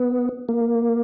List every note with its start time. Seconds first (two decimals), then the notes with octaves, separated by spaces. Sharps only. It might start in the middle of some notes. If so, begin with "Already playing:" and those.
Already playing: B3
0.49 A#3